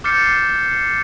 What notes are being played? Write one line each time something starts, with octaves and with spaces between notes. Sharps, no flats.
D6 F6 G6 A6 C7 C#7